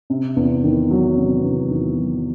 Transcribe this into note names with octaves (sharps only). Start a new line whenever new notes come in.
C3
E2
D#3
F#3
C3
E2
D#3
F#3